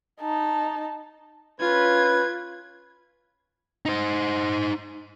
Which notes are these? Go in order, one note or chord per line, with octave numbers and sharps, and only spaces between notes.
D#4 A5
C#4 F4 B4 G#6
D#4 C5